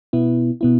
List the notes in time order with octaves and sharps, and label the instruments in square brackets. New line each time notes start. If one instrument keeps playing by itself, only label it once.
[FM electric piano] B2 B3 E4
B2 B3 E4